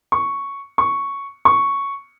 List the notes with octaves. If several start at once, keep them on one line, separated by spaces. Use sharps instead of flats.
C#6
C#6
C#6